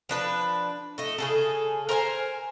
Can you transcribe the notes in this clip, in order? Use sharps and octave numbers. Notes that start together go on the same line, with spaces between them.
F3 D4 B4
A3 D#5
C#3 G#4 A4
A#4 C5 E5 G#5